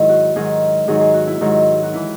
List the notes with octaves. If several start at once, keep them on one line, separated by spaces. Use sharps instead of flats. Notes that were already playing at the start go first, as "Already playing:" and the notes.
Already playing: G#2 D#3 F#3 E4
F#4
G#2 D#3 F#3 G#4
G#2 D#3 F#3 G#4
G#4
F#4
E4
G#2 D#3 F#3
F#4
E3 E4